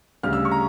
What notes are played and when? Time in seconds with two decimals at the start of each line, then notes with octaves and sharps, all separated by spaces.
0.23 D2 C#3 G3 F6
0.33 E6
0.45 C#6
0.51 A#5